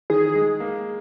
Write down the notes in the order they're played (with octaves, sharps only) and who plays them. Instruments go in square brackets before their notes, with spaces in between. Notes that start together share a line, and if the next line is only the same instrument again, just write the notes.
[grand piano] D#3 [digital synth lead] G#4
[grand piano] G#3
A#3